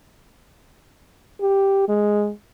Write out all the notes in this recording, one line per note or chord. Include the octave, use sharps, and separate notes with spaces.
G4
G#3